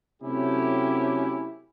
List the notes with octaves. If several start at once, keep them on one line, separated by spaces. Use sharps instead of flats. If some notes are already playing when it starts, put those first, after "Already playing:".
C3 F#3 A3 C#4 E4 G4